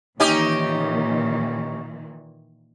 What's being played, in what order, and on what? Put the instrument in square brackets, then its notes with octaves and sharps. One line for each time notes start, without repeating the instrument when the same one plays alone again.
[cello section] A#2 D#3 E3 [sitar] C#4 D#4 G4